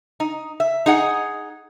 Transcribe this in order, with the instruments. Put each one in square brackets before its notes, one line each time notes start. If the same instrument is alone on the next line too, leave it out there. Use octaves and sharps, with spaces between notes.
[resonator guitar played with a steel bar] D#4
E5
D#4 G#4 F#5